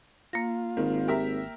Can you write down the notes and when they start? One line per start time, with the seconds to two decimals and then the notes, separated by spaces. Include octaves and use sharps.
0.33 A#3 F4 A#6
0.77 G#1 D#3
1.08 G4 A#4 E5